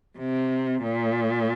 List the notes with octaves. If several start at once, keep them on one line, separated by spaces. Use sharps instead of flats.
C3
A#2